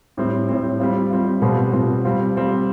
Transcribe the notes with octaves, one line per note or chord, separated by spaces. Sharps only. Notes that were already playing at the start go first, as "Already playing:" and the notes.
A2 G3 C4
A2 G3 C4
G3 C4 F4
G3 C4 F4
B2 G3 C4 F4
B2 G3 C4 F4
G3 C4 F4
G3 C4 F4